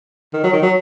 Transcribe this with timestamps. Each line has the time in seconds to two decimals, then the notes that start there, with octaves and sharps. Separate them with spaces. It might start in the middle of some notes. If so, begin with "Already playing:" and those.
0.33 D#3
0.44 F#3
0.53 D#3
0.62 F#3